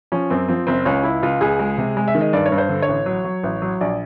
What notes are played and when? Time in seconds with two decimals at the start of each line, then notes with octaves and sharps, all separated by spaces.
0.12 F3 C#4
0.30 F#2 C4
0.48 F3 C4
0.67 F#1 C4
0.85 C#2 C#4
1.04 C#2 E4
1.23 C#2 F4
1.41 C#2 G#4
1.59 G#3
1.78 C3
1.97 G#3
2.08 E5
2.15 D#3
2.21 D#5
2.33 G2 D5
2.46 C#5
2.52 G2
2.58 C5
2.69 D3
2.82 C#5
2.88 A1
3.06 F#3
3.25 F#3
3.43 A1
3.62 F#3
3.81 A#1 D5